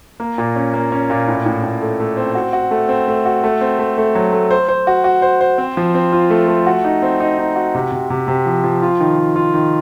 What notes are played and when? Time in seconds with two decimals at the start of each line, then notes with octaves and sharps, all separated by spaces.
0.20 A#3
0.38 A#2
0.56 C#4
0.74 A#3
0.92 C#4
1.10 A#2
1.28 A2
1.46 A2
1.64 A2
1.82 A3
2.00 A3
2.17 C4
2.35 F#4
2.53 F#4
2.71 A3
2.89 C4
3.08 A3
3.26 F#4
3.44 A3
3.61 C4
3.79 A3
3.98 A3
4.15 F#3
4.32 A3
4.51 C5
4.69 C5
4.87 F#4
5.04 F#4
5.22 C5
5.41 C5
5.58 C4
5.77 F3
5.95 C4
6.13 F4
6.30 A3
6.48 A3
6.66 F#4
6.84 D#4
7.02 C4
7.20 D#4
7.39 D#4
7.56 F#4
7.75 C3
7.92 C3
8.10 C3
8.28 C3
8.46 F3
8.64 F3
8.83 F4
9.00 D#3
9.18 D#3
9.36 F4
9.54 D#3